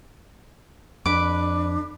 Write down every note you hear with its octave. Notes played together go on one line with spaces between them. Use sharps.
F2 D4 B4 D6